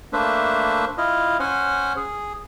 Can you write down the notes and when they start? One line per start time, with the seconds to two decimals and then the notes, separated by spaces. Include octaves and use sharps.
0.13 A3 A#3 D4 B4 C5 E5
0.98 E4 F4 D#5
1.40 C#4 C5 F#5 G#5
1.96 G#4